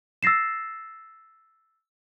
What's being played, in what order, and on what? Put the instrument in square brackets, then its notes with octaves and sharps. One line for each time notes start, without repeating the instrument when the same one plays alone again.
[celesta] E6 A6 A#6 C7 E7